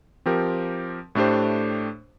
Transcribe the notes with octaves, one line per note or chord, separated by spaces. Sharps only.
F3 C4 G4 A#4
A2 A3 D4 G4 C5